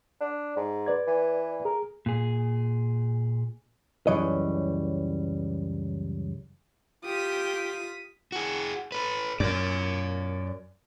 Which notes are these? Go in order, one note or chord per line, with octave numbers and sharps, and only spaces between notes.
D4
G#2
B4 D5 G#6
E3
G#4 A#4
A#2 G#4
C#2 F#2 E3 F#3 G3 D#5
F4 G4 D#6 B6
F#4 G#4
A4 B4
F#2 A#4 D5